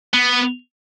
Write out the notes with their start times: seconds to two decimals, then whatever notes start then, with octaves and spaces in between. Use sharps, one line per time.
0.14 B3